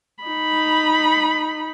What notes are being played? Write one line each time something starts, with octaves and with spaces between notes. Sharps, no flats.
D#4 B5